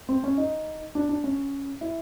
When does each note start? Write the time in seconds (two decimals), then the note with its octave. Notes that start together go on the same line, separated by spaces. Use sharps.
0.09 C4
0.24 C#4
0.38 D#4
0.95 D4
1.09 D4
1.24 C#4
1.81 E4